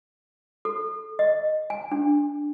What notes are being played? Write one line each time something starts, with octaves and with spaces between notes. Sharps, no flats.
A4
D#5
G#5
D4